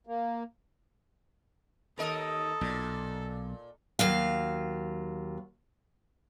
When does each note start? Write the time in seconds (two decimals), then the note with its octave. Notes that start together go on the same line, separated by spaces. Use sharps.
0.07 A#3
1.98 D#2 A4 A#4 D#5
2.61 B1 A#2
3.99 D#2 F#3 F5